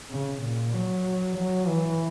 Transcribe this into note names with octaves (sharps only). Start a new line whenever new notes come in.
C#3
A#2
F#3
F#3
E3